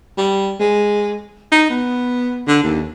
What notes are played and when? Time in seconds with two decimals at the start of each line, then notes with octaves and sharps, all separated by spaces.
0.18 G3
0.60 G#3
1.52 D#4
1.70 B3
2.47 D3
2.63 D#2